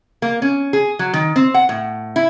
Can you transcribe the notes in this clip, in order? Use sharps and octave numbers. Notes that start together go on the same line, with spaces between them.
A#3
C#4
G#4
F#3
D#3
C4
F#5
A2
E4